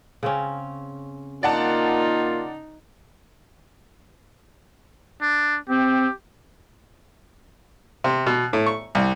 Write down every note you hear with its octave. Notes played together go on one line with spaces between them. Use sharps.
C#3 C4 C#4
A#3 D#4 F4 D5 F#5 A5
D4
C4 G4
C3
B2
A2
C#6
C2